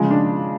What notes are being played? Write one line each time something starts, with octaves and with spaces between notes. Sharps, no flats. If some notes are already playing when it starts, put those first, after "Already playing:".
Already playing: C#3 F3 G#3
D4